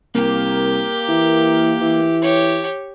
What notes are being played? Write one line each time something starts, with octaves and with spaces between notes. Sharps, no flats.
C2 A#3 G4
E3
E3
G4 C#5